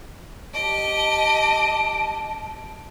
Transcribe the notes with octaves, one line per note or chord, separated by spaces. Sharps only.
G4 D#5 A5 D7